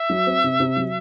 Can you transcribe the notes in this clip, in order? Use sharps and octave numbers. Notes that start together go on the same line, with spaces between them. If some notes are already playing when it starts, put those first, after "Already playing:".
Already playing: E5
F#3
C4
C3
C3
F#3